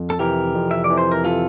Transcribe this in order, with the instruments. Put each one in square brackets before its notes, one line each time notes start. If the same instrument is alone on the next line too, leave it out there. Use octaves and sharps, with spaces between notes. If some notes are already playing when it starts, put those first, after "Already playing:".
Already playing: [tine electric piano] F2
[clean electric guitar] A4
[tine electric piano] C3 E3 [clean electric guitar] G4 A#4
[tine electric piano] F2
[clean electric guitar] E5
D5
[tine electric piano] C3 E3
[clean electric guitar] C5
A#4
F4 A4